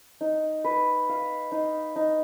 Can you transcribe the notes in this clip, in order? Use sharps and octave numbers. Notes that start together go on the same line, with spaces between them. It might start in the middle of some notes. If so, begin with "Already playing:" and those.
D#4
B4
F5
D#4
D#4